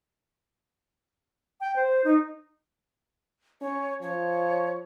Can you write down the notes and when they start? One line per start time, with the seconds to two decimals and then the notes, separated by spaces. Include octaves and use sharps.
1.61 G5
1.76 C5
2.04 D#4
3.61 C#4 C#5
4.02 F3 C#5